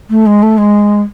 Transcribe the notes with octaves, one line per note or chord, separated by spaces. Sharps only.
A3
G#3
A3
G#3